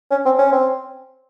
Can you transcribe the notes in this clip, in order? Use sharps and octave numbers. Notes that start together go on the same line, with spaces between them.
C#4
C4
C#4
C4